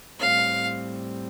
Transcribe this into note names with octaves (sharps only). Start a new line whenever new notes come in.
A2 G3 C4 F5